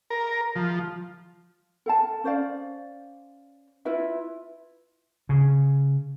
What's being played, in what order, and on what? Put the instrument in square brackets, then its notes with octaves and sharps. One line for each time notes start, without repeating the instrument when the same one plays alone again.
[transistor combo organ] A#4
F3
[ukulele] A4 F5 A5
C#4 C5 D5 F5
E4 F4 B4 E5
[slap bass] C#3